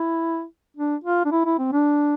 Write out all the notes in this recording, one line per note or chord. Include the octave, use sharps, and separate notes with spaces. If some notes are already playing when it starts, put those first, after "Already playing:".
Already playing: E4
D4
F4
D4
E4
E4
C4
D4